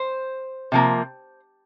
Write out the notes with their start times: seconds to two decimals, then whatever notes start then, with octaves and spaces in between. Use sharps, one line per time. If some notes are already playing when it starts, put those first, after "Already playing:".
Already playing: C5
0.72 C3 F3 A#3